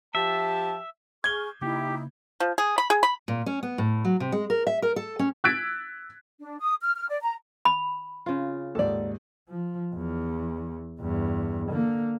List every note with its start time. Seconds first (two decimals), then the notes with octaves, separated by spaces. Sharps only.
0.15 F3 G4 E5 A5
1.24 G#4 C#6 F6 G#6 G7
1.61 C#3 A#3 D#4 E4 G4
2.40 F3
2.58 G#4
2.78 B5
2.90 G#4
3.03 B5
3.28 A#2
3.46 C#4
3.63 B3
3.78 A2
4.05 F#3
4.20 C3
4.32 G#3
4.50 A#4
4.67 E5
4.82 A#4
4.96 A4
5.19 C#4
5.44 E6 F#6 G#6 A6 B6 D7
6.41 D4
6.61 D#6
6.83 F6
6.96 F6
7.09 D5
7.23 A#5
7.65 B5
8.26 C#3 F4
8.75 D#2 G#2 A4 D5
9.49 F3
9.95 E2
11.01 E2 G2
11.69 D3 A#3